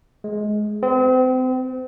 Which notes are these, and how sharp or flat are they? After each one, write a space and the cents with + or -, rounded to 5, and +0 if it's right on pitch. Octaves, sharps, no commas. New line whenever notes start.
G#3 +20
C4 -35